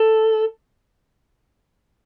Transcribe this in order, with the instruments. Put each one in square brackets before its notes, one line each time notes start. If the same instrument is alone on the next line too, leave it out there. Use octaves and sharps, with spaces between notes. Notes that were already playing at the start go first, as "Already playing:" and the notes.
Already playing: [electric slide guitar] A4